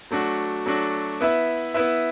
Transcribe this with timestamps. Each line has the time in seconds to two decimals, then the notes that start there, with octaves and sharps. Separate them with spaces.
0.11 F#3 A3 D4 F#4
0.66 F#3 A3 D4 F#4
1.21 B3 E4 B4 E5
1.74 B3 E4 B4 E5